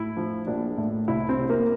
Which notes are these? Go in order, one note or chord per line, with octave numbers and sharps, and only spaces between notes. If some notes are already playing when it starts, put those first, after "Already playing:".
Already playing: A2 E4
F3
A#1 D4
A2
C2 E4
C4
C3
A#3